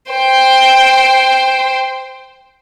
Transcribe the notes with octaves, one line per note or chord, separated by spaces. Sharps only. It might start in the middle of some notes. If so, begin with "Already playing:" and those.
C5 G5